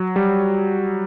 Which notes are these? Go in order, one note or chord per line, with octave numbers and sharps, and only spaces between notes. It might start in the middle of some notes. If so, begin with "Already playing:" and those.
Already playing: F#3
G3